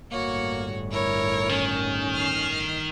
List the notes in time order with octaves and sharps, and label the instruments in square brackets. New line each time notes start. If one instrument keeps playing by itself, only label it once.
[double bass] G1 A2 [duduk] A#3 [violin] F#4 C#5
[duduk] E4 [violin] A#4 C#5
[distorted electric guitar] D#3 [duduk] C#4
[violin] F6 C7